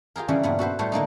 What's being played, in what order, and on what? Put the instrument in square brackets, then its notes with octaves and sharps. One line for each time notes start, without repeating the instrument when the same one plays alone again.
[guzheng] F4 G4 G#4 A#4
C#3 E3 G3 C#4 D4
G2 A#2 B3
F#4 A4 B4 C5
A2 G3 A3 C5 C#5
D3 A#3 D4 D#4